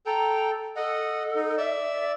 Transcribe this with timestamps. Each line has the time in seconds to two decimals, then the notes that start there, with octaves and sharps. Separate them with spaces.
0.06 A4 G5 A#5
0.76 A4 D#5 F#5
1.36 D#4
1.58 D5 E5 E6